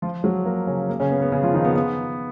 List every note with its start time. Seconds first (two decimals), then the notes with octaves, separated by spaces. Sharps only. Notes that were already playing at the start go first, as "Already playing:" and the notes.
0.02 F3 F4
0.24 F#3 F#4
0.45 A#3 A#4
0.67 C#3 C#4
0.89 A#3
1.00 C#3 C#4
1.11 B3
1.22 B3
1.32 C#3 C#4
1.43 F3 F4
1.54 D#3 D#4
1.65 B3
1.76 B3